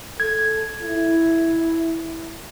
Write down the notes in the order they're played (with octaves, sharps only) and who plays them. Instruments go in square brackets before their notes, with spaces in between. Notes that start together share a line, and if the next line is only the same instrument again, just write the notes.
[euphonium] A4 [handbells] G#6
[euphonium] E4